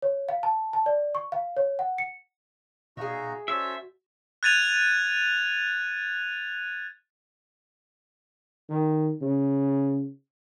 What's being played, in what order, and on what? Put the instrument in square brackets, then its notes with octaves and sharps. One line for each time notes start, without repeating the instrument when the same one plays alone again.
[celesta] C#5
F5
A5
A5
D5
C#6
F5
C#5
F#5
C#7
[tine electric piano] B2 F5 [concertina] D#4 F#4 A#5 [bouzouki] G#4 E5
[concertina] C#4 A4 C5 [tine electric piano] F#4 [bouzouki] C#5 [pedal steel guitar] E5
[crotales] F#6 G#6 A6 D#7 F7
[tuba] D#3
C#3